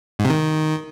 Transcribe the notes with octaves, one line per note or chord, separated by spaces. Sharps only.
G#2
C3
D#3